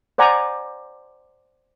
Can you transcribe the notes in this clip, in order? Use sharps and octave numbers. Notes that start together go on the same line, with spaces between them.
C5 D5 F#5 G#5 A#5